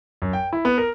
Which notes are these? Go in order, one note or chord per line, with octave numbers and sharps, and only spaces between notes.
F#2
G5
E4
B3
A#4